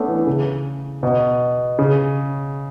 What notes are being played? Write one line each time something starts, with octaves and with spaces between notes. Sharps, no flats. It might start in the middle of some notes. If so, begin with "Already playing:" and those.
Already playing: A3 B3 C#4 D4
E3
C#3
B2
C#3